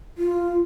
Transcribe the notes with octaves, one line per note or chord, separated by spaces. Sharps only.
F4